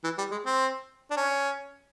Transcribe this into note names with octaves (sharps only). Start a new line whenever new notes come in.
E3
G3
G#3
C4
D4
C#4